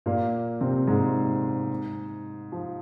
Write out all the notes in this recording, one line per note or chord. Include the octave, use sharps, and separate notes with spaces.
A#2 A#3
C3 C4
G#2 G#3
F3